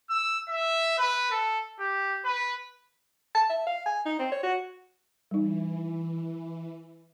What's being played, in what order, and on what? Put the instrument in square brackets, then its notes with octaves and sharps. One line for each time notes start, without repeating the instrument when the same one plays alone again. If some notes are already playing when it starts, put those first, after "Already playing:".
[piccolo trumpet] E6
E5
B4
A4
G4
B4
[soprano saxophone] A5
E5
F5
G#5
D#4
C4
C#5
F#4
[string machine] E3 [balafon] G3 D#4